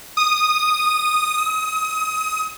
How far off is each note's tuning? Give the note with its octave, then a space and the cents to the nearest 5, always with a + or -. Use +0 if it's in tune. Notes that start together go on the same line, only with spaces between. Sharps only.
D#6 -10
D#6 +30